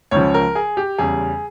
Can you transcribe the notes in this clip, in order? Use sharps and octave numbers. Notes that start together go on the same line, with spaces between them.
C#2 C#3 F3 C#5
A#4
G#4
G4
E2 C#3 G3 G#4